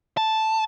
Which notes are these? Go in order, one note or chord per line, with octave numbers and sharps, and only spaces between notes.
A5